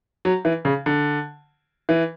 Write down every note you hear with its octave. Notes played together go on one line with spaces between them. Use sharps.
F#3
E3
C#3
D3
E3